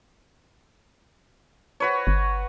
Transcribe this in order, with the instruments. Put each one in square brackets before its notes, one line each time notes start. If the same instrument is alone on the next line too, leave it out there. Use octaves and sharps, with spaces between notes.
[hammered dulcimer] F#4 B4 C#5
[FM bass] G1